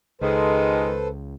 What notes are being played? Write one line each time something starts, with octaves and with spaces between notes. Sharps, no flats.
C#2 D#3 G#3 A4 B4 C5